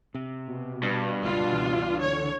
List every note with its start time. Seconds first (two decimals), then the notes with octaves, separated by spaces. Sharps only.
0.15 C3
0.48 B2
0.83 G2
1.23 G1 C#2 D4 F4
1.52 C#2 E3
2.00 D3 C#5